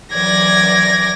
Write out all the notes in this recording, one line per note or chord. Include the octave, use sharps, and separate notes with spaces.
E3 F#3 D5 G#6 A#6